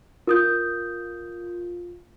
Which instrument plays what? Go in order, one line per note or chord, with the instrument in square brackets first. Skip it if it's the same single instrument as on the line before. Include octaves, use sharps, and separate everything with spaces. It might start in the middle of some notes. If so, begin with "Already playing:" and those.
[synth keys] F4 [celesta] A#4 D#6 G6